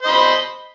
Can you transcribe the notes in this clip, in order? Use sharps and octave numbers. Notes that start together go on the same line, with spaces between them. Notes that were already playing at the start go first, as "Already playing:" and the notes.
C5 D#5 B5